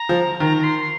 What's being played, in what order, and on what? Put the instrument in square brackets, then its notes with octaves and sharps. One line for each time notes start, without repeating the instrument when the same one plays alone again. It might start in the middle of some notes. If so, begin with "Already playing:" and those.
Already playing: [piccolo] A#5
[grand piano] F3
[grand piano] D#3 [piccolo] A#5
[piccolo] A#5
C6